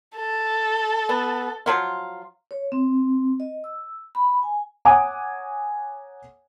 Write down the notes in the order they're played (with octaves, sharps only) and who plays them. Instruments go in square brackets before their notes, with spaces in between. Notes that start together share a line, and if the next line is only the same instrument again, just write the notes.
[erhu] A4
[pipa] B3
F3 F#3 F4
[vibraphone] C#5
C4
D#5
E6
B5
G#5
[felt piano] C#5 F#5 G#5 A#5 D6 D#6